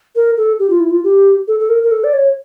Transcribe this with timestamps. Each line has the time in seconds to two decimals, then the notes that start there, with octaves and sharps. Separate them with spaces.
0.16 A#4
0.37 A4
0.59 G4
0.70 F4
0.80 E4
0.91 F4
1.04 G4
1.48 A4
1.60 A4
1.69 A#4
1.83 A#4
1.91 A4
2.04 D5
2.13 C#5